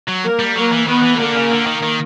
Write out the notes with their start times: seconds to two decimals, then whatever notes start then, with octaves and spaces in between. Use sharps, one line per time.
0.08 F#3
0.24 A#3 A#4
0.39 G3
0.55 F#3 A#3 A#4
0.72 E3
0.87 D#3 B3 B4
1.03 E3
1.19 D3 A#3 A#4
1.35 C#3
1.50 D3
1.66 D#3
1.82 D#3